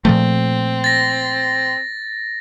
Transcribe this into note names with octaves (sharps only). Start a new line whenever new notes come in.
A#2 F3 A3 C4
A6 A#6